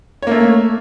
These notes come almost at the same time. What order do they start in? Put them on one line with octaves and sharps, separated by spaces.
C#5 A#3 A3